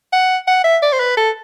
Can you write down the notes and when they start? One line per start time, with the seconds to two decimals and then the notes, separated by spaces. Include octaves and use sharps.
0.13 F#5
0.47 F#5
0.64 E5
0.82 D5
0.92 C5
1.00 B4
1.17 A4